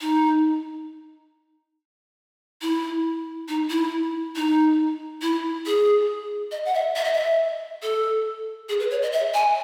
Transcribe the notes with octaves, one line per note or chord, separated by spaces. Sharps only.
D#4
E4
D#4
E4
D#4
E4
G#4
D#5
F#5
E5
E5
D#5
E5
A4
G#4
B4
C#5
D#5
E5
G#5